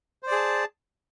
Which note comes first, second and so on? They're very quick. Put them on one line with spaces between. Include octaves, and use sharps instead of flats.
C5 D5 G#4 A5